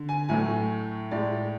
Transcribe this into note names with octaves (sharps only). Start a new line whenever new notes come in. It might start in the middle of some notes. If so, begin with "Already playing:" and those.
Already playing: D3
G#5
A2 F#3 A3 G#5
A2 G#3 D5